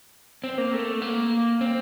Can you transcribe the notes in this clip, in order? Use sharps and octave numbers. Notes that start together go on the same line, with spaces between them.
C4
A#3
A3
A#3
C4